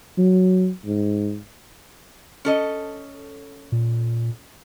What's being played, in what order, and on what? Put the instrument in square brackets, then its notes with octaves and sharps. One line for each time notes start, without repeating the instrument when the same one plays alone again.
[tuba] F#3
G#2
[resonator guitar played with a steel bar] C#4 A4 D#5
[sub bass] A#2